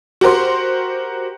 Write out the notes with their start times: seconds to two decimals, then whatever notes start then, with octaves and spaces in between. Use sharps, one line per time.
0.21 F#4 G4 A#4 C5 C6